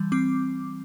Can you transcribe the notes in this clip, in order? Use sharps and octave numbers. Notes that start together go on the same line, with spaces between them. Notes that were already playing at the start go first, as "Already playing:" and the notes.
Already playing: E3 G3
C4 D6